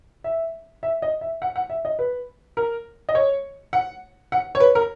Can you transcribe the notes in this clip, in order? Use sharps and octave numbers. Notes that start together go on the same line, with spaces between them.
E5
E5
D#5
E5
F#5
F#5
E5
D#5
B4
A#4
D#5
C#5
F#5
F#5
C#5
B4
A#4